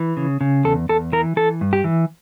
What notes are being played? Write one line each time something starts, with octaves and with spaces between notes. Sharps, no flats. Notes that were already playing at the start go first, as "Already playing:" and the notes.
Already playing: E3
C#3
C#3
E2 A4
E2 A4
E3 A#4
E3 A4
G2
G4
E3